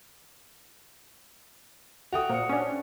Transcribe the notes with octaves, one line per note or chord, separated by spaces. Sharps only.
F#4 A4 E5 G5 D#6 F7
A#2 C5 C#7
C#4 D4